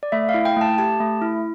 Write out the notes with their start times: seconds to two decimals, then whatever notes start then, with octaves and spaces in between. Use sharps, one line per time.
0.03 D5
0.12 A3 E5
0.29 F5
0.34 E4
0.45 G5
0.56 A3 A5
0.78 G4 A5
1.00 A3
1.22 E4